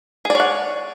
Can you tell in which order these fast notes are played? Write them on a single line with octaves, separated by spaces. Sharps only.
G#4 D5 C#5 F#5